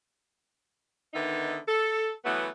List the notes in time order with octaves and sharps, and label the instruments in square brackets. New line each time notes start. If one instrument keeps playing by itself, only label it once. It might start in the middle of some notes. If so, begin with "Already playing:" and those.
[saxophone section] D3 D#3 B3 D#4 E5
A4
E3 F#3 A3 B3